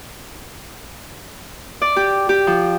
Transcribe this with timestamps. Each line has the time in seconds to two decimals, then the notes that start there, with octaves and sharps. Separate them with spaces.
1.82 D5
1.96 G4
2.29 G4
2.47 F3